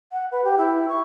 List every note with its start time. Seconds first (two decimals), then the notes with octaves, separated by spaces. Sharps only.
0.12 F#5
0.32 B4
0.44 G4
0.58 E4
0.89 C#6